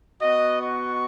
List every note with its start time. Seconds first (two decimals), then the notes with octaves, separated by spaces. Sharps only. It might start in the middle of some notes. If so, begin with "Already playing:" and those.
0.22 B3 F#4 D#5
0.62 C#6